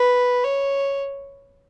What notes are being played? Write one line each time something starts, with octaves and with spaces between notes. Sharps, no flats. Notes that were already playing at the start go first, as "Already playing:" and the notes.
Already playing: B4
C#5